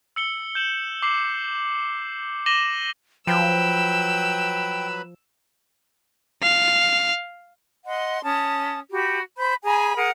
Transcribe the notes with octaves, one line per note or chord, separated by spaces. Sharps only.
E6 C#7 G7
G6 E7 F#7
D6 C7 F#7
D6 A#6 D#7 E7 F#7 G7
F3 F#3 B4 G5 B5 E6
F5
D#5 F#5 C6
C#4 A5 D#6
F#4 G4 B5
C5 B5 G6
G#4 G#5 A#5 B5
G#4 A#4 F#5